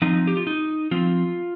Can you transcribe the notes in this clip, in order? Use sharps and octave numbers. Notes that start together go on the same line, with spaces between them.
F3 C4 D#4
G4
F4
D#4
F3 C4 F4